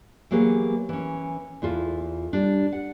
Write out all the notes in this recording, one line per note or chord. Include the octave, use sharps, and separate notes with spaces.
E3 F#3 A#3 B3 G4 G#4
E3 C#4
E2 E4 F4 A4
G3 D4
F#5